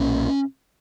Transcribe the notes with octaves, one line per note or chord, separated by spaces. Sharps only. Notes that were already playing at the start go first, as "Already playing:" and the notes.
Already playing: B1 A#2 C#4